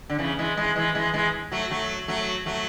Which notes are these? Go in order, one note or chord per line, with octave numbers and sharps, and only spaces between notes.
D3
C#3 E3
E3 G#3
E3 G#3
E3 G#3
E3 G#3
E3 G#3
F#3 A3
F#3 A3
F#3 A3
F#3 A3